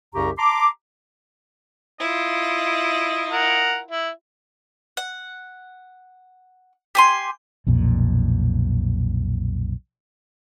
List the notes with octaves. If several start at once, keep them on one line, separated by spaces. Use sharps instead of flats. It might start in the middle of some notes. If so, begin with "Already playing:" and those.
C2 F#2 C#3 G4 A#5 C#6
A5 A#5 C6 D6
E4 F4 D#5
A#4 F#5
E4
F#5
G4 G#5 C6
B1 F2 A#2